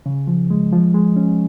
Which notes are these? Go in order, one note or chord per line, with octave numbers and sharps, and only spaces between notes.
C#3
F3
G#3
F3
G#3
C#4